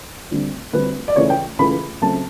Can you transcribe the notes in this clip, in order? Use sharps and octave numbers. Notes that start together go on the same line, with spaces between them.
D2 D3 G3 C4
D2 D3 G3 C4 B4
D5
C#2 C#3 E3 A3 C#5
G5
C#2 C#3 E3 A3 B5
C#3 F#3 A3 C4 A5